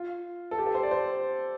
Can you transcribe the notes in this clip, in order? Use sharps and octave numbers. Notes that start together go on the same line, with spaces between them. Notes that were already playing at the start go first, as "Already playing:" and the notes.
Already playing: F4
A4
G4
A4
C5
D5
C5